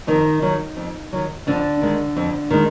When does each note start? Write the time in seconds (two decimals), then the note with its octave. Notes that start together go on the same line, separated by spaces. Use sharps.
0.07 F2 D#3 D#4
0.42 D#3 F#3
0.77 F2
1.13 D#3 F#3
1.47 F2 D3 D4
1.82 D#3 G#3
2.17 F2
2.50 D#3 G#3